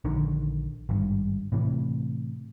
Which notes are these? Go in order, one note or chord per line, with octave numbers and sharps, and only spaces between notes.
A#1 D3 D#3
G#1 G2
A2 C3 E3